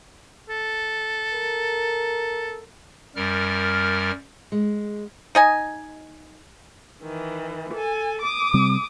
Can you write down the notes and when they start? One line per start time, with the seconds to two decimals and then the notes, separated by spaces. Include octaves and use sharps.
0.49 A4
1.33 A#4
3.16 F#2 G3 A#4 F6
4.52 G#3
5.35 D#4 D#5 G#5
7.02 D#3 E3
7.73 A4 G#5
8.22 D6 D#6
8.54 C3 G3 C4